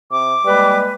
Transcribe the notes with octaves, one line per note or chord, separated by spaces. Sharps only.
C3 D6
G3 G#3 A#3 B4